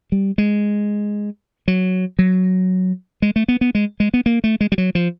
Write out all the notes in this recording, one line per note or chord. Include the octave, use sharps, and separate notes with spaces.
G3
G#3
F#3
F#3
G#3
A3
B3
B3
G#3
G#3
B3
A#3
A3
G#3
G3
F#3
F3